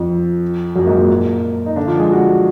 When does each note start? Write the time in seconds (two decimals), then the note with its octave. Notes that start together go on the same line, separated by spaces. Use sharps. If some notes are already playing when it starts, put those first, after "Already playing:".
Already playing: F2 F3
0.76 F#2 F#3
0.82 A#3
0.87 G#2 G#3
0.98 A#2 A#3
1.66 D#4
1.76 D3 D4
1.88 F3 F4
1.99 G#3 G#4
2.11 F#3 F#4